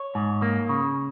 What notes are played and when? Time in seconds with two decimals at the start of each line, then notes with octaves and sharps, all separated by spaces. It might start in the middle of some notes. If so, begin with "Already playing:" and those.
Already playing: C#5
0.15 G#2
0.42 A#3
0.69 C#3